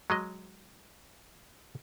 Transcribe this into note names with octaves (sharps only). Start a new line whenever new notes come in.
F#3 G#3 D#5